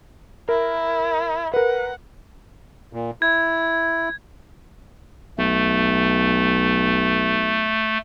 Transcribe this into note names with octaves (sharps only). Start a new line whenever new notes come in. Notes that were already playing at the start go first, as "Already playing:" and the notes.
E4 A#4
A#4 B4 F#5
A#2
E4 G#6
B1 A3